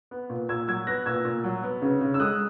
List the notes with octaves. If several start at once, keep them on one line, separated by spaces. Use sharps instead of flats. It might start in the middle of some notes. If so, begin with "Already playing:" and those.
B3
A#2
A#2 E6 G#6
F#3 E6 G#6
B3 F#6 A#6
A#2 E6 G#6
A#2
F#3
B3
C#3
C#3
E6
G#3 D#6 F#6